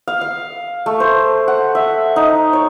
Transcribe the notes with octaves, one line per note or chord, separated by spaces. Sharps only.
F5
F5
A3
C5
F#5
E5
D#4
C#5